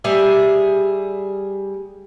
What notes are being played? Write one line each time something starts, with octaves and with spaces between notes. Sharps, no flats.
G3 G#4 E5